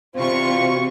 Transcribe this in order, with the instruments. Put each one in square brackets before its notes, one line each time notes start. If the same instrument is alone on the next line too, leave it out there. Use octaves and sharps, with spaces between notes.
[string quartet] C3 E3 G3 [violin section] F4 C#6 [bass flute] C5
[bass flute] F#4